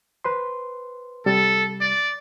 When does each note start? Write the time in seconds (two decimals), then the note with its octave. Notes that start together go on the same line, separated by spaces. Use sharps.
0.24 B4 C5 C6
1.26 C3 G3 A4
1.81 D5